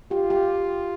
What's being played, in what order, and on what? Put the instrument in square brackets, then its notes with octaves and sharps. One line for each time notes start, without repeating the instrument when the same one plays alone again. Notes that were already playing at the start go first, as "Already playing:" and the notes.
[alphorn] F4 [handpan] G4
[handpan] G4